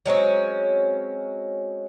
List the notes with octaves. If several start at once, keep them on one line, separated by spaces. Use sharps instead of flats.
F#3 G#3 C4 C#4